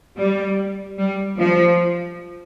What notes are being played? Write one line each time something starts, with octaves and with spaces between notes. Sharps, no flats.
G3
G3
F3